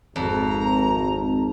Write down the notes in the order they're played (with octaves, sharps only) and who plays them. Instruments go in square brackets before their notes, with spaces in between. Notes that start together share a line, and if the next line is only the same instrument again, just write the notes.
[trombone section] G#1 [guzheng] F2 [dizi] A#5